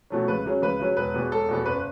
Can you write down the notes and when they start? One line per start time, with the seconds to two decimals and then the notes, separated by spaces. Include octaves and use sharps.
0.10 B2 F#3 A3 C#4
0.28 C#2 B4
0.45 C#3 F#3 C#4
0.62 C#2 B4
0.80 C#3 F#3 C#4
0.97 E1 B4
1.14 E2 B2 B3
1.31 E1 A4
1.48 E2 B2 B3
1.66 F#1 B4